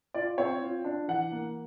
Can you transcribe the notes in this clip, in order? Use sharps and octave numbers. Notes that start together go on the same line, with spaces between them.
F4 D5
C4 C#5
F4
D4
E3 F#5
A#3